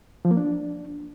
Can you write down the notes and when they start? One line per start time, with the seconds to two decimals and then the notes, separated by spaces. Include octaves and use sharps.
0.25 F3
0.31 A#3
0.37 D4